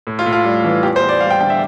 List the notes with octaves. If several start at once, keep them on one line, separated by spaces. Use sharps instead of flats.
A2
F4
A2
F4
G3
E3
E2 G4
C5
E2
D5
G3 F5
G5
D3 G5
E5